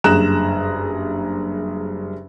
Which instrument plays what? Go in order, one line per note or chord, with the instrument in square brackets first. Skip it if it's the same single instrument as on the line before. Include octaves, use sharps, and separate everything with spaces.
[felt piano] F#1 G2 G#4 A#5 F#6 E7